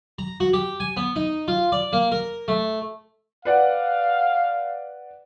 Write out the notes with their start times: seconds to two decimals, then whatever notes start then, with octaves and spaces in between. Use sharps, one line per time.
0.19 A#5
0.40 F#4
0.53 G4
0.80 G#5
0.97 B3
1.16 D#4
1.48 F4
1.72 D5
1.93 A#3
2.12 A#4
2.48 A3
3.45 B4 D5 F5 F#5